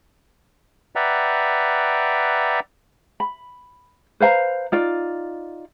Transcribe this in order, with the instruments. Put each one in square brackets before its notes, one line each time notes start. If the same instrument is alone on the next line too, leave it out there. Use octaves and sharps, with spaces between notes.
[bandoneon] B4 D5 E5 F#5 G5 A#5
[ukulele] B5
B4 C5 F5 A#5
D#4 F4 D5